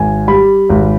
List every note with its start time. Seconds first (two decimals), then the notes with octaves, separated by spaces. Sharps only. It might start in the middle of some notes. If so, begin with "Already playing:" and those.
Already playing: G#1 G#5
0.28 G3 B5
0.69 G#1